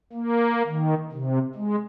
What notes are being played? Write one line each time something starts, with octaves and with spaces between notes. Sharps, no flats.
A#3
D#3
C3
G#3